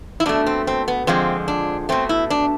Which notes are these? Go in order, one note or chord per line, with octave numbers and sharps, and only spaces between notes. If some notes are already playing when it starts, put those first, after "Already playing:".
E4
B2 A3 D4
C4
C4
B3
F2 D3 F3 G#3 C4
D4
B2 A3 C4
E4
D4